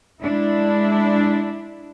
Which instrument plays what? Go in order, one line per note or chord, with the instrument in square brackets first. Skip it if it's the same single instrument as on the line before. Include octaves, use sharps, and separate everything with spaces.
[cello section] G#3 D4 E4